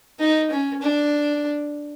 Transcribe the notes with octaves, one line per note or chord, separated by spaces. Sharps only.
D#4
C#4
D4